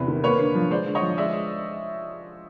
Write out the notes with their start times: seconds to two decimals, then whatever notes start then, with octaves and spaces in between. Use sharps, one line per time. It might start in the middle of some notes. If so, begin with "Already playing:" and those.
Already playing: E2 C3 B4
0.08 D#3
0.24 A#3 B4 C#5
0.39 D3
0.55 F3
0.71 G#3 C5 D5
0.86 D3
0.95 C#5 D#5
1.02 F3
1.17 G#3 D5 E5